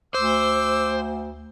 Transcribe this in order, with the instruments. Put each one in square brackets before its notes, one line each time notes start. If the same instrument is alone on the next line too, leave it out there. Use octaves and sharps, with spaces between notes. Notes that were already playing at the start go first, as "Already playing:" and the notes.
[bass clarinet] D2 [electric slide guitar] C5 [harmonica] D6 E6